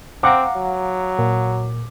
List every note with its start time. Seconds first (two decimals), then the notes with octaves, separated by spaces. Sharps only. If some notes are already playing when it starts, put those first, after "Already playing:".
0.23 C4 F5 F#5 A#5 D6
0.56 F#3
1.19 A#2